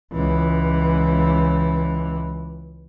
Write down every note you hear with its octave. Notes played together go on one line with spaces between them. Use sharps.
C#2 E3